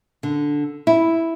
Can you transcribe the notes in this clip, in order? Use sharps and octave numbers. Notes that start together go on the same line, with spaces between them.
D3
E4